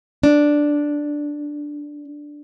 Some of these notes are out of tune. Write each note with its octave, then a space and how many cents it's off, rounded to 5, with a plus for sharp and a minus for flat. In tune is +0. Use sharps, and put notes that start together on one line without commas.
D4 +0